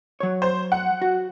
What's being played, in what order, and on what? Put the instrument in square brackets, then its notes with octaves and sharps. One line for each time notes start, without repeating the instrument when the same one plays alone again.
[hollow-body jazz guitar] F#3 C#5
[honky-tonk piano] C5
F#5
[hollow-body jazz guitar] F#4